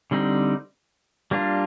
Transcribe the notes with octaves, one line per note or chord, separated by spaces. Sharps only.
D3 G3 C4 D#4
G3 A#3 D4 F4